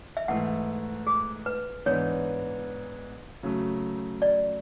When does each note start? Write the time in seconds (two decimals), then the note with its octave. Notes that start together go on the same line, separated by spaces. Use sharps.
0.17 E5
0.28 G#2 E3 A3 F#5
1.07 G#4
1.46 B4
1.86 G#2 E3 B3 D4 C#5
3.43 C#3 F#3 A3
4.22 D5